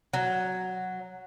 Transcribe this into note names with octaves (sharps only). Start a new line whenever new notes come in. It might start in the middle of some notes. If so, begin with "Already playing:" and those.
F#3